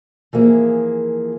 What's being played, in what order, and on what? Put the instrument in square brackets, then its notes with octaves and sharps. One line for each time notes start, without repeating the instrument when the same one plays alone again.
[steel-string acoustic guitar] E3 F3 A#3 G#4